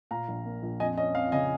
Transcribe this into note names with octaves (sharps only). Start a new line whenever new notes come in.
A#2 F5 A#5
A#1
A#3
A#1
F2 D#5 G#5
C#4 D#5
F2 F5
C#3 D#5 G#5